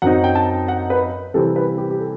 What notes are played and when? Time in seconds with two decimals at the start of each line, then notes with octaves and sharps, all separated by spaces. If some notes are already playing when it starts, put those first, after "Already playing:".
0.02 F#2 F#3 C4 D#4 F#5
0.24 G5
0.35 A5
0.68 F#5
0.90 B4
1.34 C3 E3 G3 C4 A4
1.56 B4
1.78 G4
1.90 G4
2.00 A4